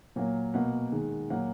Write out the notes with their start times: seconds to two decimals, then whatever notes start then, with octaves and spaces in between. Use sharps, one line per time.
0.16 A#2 F#3 A#3
0.54 B2 A#3 F#5
0.92 D#3 G#3
1.30 A#2 F#3 A#3 F#5